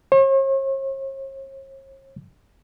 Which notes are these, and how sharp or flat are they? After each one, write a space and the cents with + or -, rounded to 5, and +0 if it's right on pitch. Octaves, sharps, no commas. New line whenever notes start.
C#5 -45